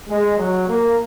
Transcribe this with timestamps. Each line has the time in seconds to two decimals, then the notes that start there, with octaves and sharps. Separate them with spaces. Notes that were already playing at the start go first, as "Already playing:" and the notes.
0.08 G#3
0.38 F#3
0.68 A#3